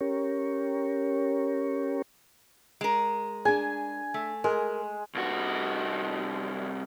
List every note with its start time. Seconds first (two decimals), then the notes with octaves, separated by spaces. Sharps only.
0.01 C#4 G4 A#4 C#5
2.81 G#3 A#4
3.45 D4 G#4 G#5
4.14 A3
4.44 G#3 A#4
5.15 C2 F#4